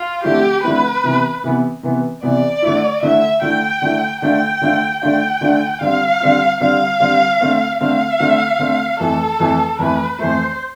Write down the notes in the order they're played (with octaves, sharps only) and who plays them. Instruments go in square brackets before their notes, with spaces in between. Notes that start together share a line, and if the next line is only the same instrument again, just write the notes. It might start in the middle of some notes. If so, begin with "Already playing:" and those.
Already playing: [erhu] F4
[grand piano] D3 F3 A3 C4 E4 [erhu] G4
[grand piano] D3 F3 A3 C4 E4 [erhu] B4
[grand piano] C3 E3 B3
C3 E3 B3
C3 E3 B3
[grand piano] C3 E3 B3 [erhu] D5
[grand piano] D3 A3 E4
[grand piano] D3 A3 E4 [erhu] E5
[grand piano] D3 A3 E4 [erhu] G5
[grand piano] D3 A3 E4
[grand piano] D3 A3 D4 F4 [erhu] G5
[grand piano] D3 A3 D4 F4
[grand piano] D3 A3 D4 F4 [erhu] G5
[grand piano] D3 A3 D4 F4
[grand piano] D3 G3 C4 F4 [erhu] F5
[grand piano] D3 G3 C4 F4
[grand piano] D3 G3 C4 F4 [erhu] F5
[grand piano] D3 G3 C4 F4
D3 A3 C4
[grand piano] D3 A3 C4 [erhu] F5
[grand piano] D3 A3 C4
D3 A3 C4
[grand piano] F2 E3 A3 [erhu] A4
[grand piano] F2 E3 A3
[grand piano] F2 E3 A3 [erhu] B4
[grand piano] F2 E3 A3 [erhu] C5